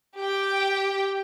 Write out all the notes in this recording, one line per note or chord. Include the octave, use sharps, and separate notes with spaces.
G4 G5